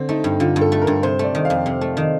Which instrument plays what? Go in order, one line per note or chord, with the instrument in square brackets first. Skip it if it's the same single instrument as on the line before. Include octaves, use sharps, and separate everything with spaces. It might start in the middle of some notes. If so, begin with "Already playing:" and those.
Already playing: [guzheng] D3 [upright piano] C4
[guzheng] A3 [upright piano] D#4
[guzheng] G2
[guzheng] D3 [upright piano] F4
[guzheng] G2
[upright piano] A4
[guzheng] A3
[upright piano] A#4
[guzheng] G2
[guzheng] C3 [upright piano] C5
[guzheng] A3 [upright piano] D5
[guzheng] D#3
[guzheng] F2 [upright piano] F5
[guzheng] C3
A3
D#3